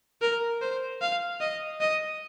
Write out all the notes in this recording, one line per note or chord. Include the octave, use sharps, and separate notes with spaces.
A#4
C5
F5
D#5
D#5